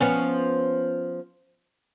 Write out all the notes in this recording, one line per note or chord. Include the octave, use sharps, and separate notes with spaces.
F3 B3 C#4